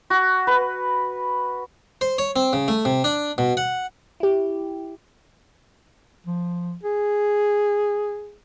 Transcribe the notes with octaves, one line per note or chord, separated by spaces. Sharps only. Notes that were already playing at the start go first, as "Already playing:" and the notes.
F#4
B4
C5
C#5
C4
C#3
A3
C3
D4
B2
F#5
E4 G4
F3
G#4